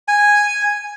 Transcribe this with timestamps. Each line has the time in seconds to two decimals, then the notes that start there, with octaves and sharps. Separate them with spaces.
0.08 G#5